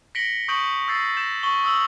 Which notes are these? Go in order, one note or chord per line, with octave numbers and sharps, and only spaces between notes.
A#6 B6 C#7 D7 F#7 G7
C#6 D#6 G6 D7 F#7
E6 G6 A6 C7
G6 A#6 E7
C#6 F#7 G7
D#6 E6 F#7